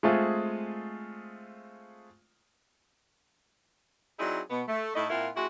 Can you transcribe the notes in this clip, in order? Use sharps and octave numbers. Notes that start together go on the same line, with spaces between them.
G#3 A3 C4 F4 G#4
F#3 C4 D#4 E4 G#4 D5
B2 B3
A3
A2 A3 D#4 E4 D#5
A#2 C4 E4 F4 A#4 F#5
G#3 C4 E4 F#4 G4